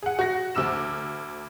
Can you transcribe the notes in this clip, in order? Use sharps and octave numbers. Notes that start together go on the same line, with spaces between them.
G#4 F#5
F#4 F#6 A#6
D2 D6 E6 F6 E7